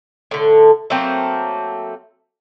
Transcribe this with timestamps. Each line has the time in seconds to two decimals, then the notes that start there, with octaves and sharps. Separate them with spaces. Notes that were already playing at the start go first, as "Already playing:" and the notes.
0.31 A2 D3
0.90 F#3 A3 A#3 C4